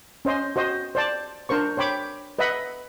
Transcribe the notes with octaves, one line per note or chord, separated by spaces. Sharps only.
C#4 C5 D#5 C6
F#4 C5 D#5
C5 D5 A5
D4 A#4 C5 C#6
C5 C#5 G5 B5 D6
B4 D#5 E5 F#5 B5